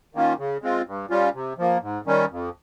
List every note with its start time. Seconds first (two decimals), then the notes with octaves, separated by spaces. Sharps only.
0.15 D#3 A#3 C#4 F4
0.38 C#3
0.62 G#3 C4 F4
0.87 G2
1.10 G3 C#4 F4
1.34 C3
1.58 F3 A#3
1.82 G#2
2.06 D#3 G3 C#4
2.30 F2